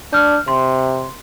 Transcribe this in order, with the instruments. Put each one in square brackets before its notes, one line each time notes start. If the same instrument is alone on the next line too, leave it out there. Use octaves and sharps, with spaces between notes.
[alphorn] D4 [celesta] F6 G6
[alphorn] C3 [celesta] C6